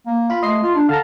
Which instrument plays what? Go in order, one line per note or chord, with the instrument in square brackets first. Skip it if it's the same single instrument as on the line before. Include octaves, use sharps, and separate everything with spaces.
[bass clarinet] A#3
[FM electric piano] F4 B5
[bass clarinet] A3 [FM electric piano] D#5 C6 C7
[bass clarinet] F4
D4
[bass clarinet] D3 [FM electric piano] F5 A5 A#5